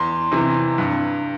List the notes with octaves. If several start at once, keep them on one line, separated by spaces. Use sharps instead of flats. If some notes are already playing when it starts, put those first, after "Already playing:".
Already playing: E2 C6
C3 E3
G2